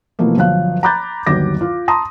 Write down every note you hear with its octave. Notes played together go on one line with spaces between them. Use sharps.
B2 E3 F3 A3 A#3
G1 F3 F#3 F#4 F5 F#6
A#5 B5 D6 F#6 G6 A6
G1 D#2 F#3 D6 A#6
F4
A5 A#5 C6 D#6 A#6